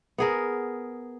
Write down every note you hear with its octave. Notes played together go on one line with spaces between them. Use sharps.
B3 G#4 A#4